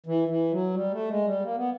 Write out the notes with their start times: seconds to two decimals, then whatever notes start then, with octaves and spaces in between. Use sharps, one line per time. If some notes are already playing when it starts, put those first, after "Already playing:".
0.06 E3
0.28 E3
0.51 F#3
0.74 G3
0.91 A3
1.08 G#3
1.25 G3
1.42 A#3
1.56 B3